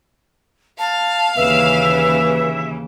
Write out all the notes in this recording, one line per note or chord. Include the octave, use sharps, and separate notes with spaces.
F5 A5
D#2 C#3 E3 B4 E5